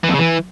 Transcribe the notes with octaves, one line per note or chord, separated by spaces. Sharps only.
E3
F2
C#3
E3